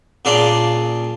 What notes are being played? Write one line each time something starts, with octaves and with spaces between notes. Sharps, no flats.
A#2 C#3 D4 D5 F5 C6